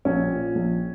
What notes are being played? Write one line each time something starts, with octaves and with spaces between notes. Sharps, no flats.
A#1 C#4
A#2
A#1